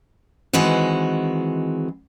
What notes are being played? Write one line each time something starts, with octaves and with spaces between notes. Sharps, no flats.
D#3 E3 G#3 C4 F#4